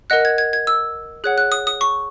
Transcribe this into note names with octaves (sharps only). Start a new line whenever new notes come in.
A#4 D#5 F#5 F#6
G#6
G#6
G#6
E6
G#4 C#5 F#5 F#6
F#6
D#6
D#6
C#6